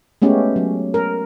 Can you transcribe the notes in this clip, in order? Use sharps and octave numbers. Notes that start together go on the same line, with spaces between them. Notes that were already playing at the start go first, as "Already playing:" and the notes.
G#3 A3 B3 C#4 G4
F#3
A#4